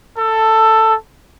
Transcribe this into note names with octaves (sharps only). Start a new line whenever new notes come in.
A4